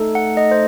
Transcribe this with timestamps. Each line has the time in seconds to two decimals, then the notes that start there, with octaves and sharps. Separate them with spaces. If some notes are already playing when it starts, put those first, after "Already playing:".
Already playing: A3 D#4 A4
0.15 F#5
0.37 D#5
0.51 C5